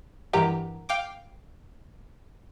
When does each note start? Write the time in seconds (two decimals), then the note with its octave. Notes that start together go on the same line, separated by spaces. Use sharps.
0.33 G2 E3 G4 A#4 F#5 A#5
0.89 F5 G5 D6